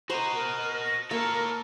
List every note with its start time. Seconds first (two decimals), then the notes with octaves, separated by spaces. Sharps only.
0.10 F#4 C5 D#5 A#5 C6
0.34 A#4
0.81 A#6
1.11 A#3 A4 A#4 C#5